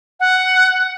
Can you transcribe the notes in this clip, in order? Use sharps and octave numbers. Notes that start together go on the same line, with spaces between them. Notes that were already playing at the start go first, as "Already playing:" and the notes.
F#5